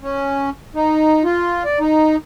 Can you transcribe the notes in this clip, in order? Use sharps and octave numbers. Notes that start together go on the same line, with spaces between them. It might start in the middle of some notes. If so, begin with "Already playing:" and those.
C#4
D#4
F4
D5
D#4